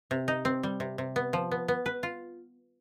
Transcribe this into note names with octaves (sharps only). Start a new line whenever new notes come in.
C3
D#4
C4
G3
C3
C3
B3
F3
B3
B3
B4
F4